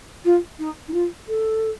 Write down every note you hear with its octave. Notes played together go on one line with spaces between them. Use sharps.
F4
D#4
D#4
F4
A4